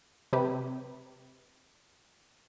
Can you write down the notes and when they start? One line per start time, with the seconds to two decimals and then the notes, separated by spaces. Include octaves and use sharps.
0.33 C3 G4 B4